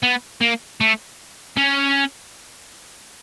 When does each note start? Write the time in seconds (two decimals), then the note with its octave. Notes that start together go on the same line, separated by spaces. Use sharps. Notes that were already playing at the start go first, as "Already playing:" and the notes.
0.03 B3
0.41 A#3
0.81 A3
1.57 C#4